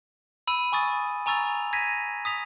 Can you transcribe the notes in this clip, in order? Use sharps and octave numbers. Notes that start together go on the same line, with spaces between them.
B5 E6 D#7
G#5 C#6 D#6 A6
G#5 A#5 C#6 E6 A6 F7
G#6 A#6 B6 D#7
D#6 B6 F7